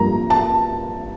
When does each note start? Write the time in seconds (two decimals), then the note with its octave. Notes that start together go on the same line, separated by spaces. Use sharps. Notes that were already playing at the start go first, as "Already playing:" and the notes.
Already playing: G2 F3 A#3 A#5
0.30 A5